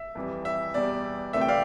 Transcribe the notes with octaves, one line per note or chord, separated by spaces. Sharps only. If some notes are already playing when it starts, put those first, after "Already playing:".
Already playing: E5
F2 E3 G3
E5
E2 B2 G3 D5
D2 C3 E3 A3 E5
G5
D5 F5